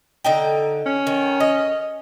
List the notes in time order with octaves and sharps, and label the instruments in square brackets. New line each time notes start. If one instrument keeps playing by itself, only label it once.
[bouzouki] D3 D#4 G5
[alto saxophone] C#4
[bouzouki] D#3
D#5